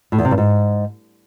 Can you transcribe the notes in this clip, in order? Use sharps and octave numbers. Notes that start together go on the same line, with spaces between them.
A2
E2
C3
G2
G#2